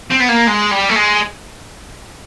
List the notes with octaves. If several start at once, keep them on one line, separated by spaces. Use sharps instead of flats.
C4
B3
A#3
G#3
G3
A3
G#3